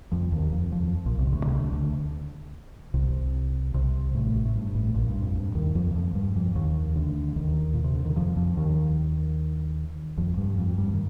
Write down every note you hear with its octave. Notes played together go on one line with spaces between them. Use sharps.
F2 F3
D#2 D#3
F2 F3
F2 F3
A#1 A#2
C2 C3
D2 D3
C2 C3
D2 D3
D2 D3
C2 C3
C2 C3
A1 A2
A2
G2
A1 A2
A#1 A#2
G2
F2
G2
D#2 D#3
F2 F3
D#3
F2 F3
G2 G3
F2 F3
D#2 D#3
D2 D3
D#2 D#3
A#2
C3
D3
D#3
F2 F3
F2 F3
D#2 D#3
F2 F3
G2 G3
F2 F3
G2 G3
D#3